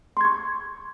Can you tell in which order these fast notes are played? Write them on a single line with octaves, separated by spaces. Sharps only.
C6 G#6 C#6